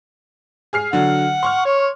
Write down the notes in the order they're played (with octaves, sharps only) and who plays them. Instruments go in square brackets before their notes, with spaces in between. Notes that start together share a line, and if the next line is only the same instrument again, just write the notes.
[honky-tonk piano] G#4 F6 C7
[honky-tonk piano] D3 F#3 [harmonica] F#5
[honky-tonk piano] C6 C#6 F6
[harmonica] C#5